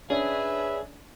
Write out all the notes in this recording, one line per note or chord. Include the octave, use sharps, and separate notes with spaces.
C#4 D4 G#4 B4 E5